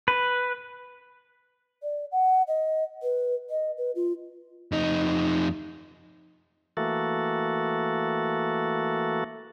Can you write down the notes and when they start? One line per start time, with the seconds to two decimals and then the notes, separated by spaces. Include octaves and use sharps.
0.08 B4
1.83 D5
2.12 F#5
2.48 D#5
3.03 B4
3.50 D#5
3.77 B4
3.95 F4
4.72 F2 D#4
6.77 E3 A3 A#3 F#4 A4